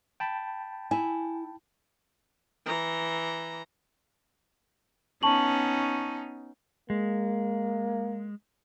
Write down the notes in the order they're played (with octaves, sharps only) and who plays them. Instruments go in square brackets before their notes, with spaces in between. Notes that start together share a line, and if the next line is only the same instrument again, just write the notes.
[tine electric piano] G5 A5 B5
[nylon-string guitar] E4 [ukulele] G#5
[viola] E3 A#5
[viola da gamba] B3 C#4 D#4 [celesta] A5 C#6 F#7
[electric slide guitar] G#3 [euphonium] A#3